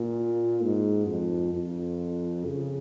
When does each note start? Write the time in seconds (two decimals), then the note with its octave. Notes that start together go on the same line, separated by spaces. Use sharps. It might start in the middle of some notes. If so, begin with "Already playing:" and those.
Already playing: A#2
0.63 G#2
1.08 F2
1.54 F2
2.46 C#3